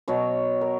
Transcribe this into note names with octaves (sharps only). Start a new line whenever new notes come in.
B2 F#3 C#5
A#4